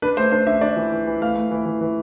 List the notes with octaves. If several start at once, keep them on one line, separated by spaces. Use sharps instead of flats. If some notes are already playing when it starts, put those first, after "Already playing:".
D4 B4
A3 C5
D4 C5
D4 E5
D4 D5
E3
E3
E3
A3 F5
A3
E3
E3
E3